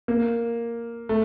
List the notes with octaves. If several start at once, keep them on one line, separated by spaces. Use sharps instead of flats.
A#3
A3